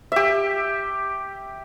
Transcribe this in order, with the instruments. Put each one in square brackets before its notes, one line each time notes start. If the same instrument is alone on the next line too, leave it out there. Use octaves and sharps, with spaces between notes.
[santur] G4 E5